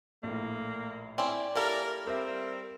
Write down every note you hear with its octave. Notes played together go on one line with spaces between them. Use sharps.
A#1 A2 A#3
C4 C#4 E4 D5
A#3 E4 G4 A4 A#4
G3 C4 G4 A#4 E5